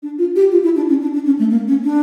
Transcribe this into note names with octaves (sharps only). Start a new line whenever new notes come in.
D4
F4
G4
F4
E4
D4
C#4
D4
D4
C#4
A3
A#3
C#4
D4